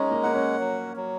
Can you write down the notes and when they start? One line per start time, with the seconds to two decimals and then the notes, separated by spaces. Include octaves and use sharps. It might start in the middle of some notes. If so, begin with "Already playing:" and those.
Already playing: G#3 C#4 D#4 A#4
0.11 A#3
0.23 A#3 F#5
0.34 C#4
0.59 F#3
0.96 F#3